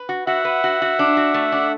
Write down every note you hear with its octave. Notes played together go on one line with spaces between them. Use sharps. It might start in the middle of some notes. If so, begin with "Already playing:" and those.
Already playing: B4
F#4
F#4 E5 F#5
B4
F#4
F#4
D4
F#4
A3
D4